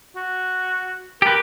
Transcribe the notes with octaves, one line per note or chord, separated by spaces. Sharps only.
F#4
G4 A#4 B4